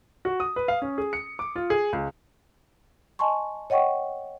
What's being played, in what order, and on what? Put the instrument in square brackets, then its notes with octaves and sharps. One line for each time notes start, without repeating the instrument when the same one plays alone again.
[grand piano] F#4
D#6
B4
F5
C#4
G#4
C#7
D6
F4
G#4
C#2
[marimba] D#5 G#5 A5 C6 C#6
C#5 D#5 F#5 G5 C#6